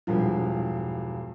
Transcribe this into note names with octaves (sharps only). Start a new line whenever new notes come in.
E1 G2 F3